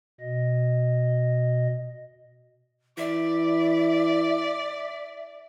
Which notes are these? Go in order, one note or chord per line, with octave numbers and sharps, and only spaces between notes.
B2 D#5
E3 D5 E5